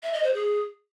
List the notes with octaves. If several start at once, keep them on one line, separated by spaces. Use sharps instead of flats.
E5
D#5
C5
G#4